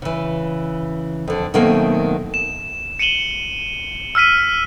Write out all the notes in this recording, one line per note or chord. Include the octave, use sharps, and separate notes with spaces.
C#3 E3
F2 D3
B2 D#3 F#3 A3 A#3 C4
E7
C#7 D#7 E7 F#7 G7
E6 F6 B6 D#7